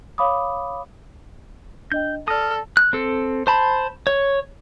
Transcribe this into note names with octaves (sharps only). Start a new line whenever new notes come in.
C#5 F5 B5 D6 D#6
D4 D#5 G5 G6
A4 D5 D#6 F6 A#6
F#6
C4 A4
C5 A5 B5
C#5